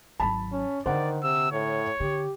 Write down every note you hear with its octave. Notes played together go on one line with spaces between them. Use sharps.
G#1 F#3 A5 B5
C#4
D3 D#3 C5 D5 F#5
C3 E6
A2 C#5
D3 G4